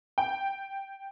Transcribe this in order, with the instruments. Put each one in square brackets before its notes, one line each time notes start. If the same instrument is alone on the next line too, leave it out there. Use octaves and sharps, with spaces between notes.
[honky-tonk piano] G5